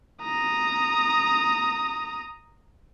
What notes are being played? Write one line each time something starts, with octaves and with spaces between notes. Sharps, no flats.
A#5 D#6